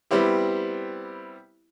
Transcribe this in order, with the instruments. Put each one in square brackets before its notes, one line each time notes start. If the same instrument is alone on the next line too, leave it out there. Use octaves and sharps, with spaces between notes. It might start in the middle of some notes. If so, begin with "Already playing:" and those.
[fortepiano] G3 B3 C4 E4 G4